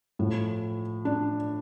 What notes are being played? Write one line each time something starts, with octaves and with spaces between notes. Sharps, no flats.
A2 F3
D4